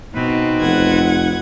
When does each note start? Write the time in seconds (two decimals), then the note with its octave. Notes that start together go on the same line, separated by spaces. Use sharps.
0.14 B2 C4 D#4 B4
0.61 F1 F#5 G#6